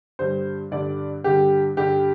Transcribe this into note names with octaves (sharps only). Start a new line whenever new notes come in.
G2 D3 G3 C5
G2 D3 G3 D5
G2 D3 G3 G4
G2 D3 G3 G4